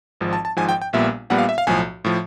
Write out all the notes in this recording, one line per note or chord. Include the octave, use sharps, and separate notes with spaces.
G#1 G#2 F3
A5
A5
G#1 G#2 F3 G#5
G5
G5
A#1 A#2 G3 B3 E5
A#1 A#2 G3 B3 F#5
F5
E5
F5
B1 A2 F3 G#5
A2 F3